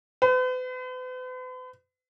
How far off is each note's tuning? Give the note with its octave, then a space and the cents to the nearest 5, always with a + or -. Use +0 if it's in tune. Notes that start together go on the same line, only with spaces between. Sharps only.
B4 +45